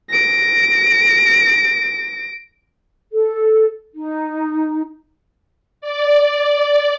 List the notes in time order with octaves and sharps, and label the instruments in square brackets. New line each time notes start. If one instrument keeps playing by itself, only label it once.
[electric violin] A#6 D7
[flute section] A4
D#4
[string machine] D5